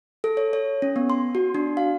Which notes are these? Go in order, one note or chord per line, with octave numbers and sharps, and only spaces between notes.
A4
C#5
C#5
C#4
B3
C6
F#4
D4
F5